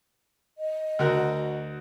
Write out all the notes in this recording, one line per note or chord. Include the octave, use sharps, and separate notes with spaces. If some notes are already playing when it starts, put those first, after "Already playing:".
D#5
D2 F#4 A#4